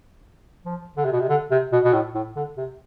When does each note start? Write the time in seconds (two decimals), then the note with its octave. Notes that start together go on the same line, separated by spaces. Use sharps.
0.65 F3
0.97 D3
1.05 C3
1.12 B2
1.20 C3
1.29 D3
1.51 C3
1.72 B2
1.84 B2
1.93 A2
2.15 A2
2.36 D3
2.57 C3